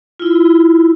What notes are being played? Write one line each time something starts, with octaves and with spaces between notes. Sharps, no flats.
E4 F4